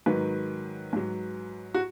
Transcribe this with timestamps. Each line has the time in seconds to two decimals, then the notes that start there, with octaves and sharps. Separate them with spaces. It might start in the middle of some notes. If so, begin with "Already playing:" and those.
0.06 G#2 D#3 F#3 B4
0.93 G#2 F#3
1.74 F#4